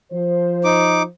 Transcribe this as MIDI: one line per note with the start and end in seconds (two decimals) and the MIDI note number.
0.12 1.05 53
0.12 1.05 72
0.64 1.02 63
0.64 1.02 86